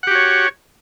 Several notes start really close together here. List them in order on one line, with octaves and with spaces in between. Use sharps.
F#5 G4 F#4 C#5